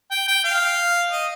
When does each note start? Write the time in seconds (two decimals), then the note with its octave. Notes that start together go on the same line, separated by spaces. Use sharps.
0.11 G5
0.28 G5
0.44 F5
1.11 D#5